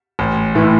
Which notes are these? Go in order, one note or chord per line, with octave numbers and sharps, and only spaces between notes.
A1
A2 E3 A3